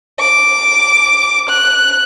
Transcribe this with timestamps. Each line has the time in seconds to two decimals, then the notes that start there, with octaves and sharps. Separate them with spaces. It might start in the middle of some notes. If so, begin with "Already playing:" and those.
0.20 D6
1.49 F#6